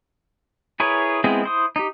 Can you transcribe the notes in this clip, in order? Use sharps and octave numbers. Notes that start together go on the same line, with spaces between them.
E4 G#4 A#4 B4 C#5
G#3 B3 C4 E4 G#4
E4 C5 D#6
D#4 G4